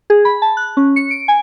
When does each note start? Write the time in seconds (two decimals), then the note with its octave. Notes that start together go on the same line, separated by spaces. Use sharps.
0.10 G#4
0.25 B5
0.42 A5
0.57 F#6
0.77 C#4
0.96 C#7
1.11 D7
1.28 G#5